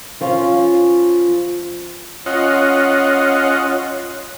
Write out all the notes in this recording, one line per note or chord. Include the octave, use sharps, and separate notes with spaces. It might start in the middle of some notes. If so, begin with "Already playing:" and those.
F3 C#4 F4
C#4 F4 D#5 F#5